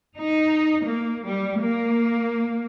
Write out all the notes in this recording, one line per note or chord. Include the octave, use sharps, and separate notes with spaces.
D#4
A#3
G3
A#3